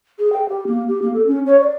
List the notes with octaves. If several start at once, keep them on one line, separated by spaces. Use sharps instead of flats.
G#4
G5
G4
A#3
G4
A#3
A4
C#4
C#5
D5